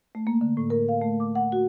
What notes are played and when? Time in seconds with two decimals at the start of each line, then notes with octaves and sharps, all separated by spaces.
0.15 A3
0.27 A#3
0.41 D3
0.57 A2
0.70 A#4
0.88 F5
1.02 A3
1.20 D6
1.35 F#5
1.52 F#4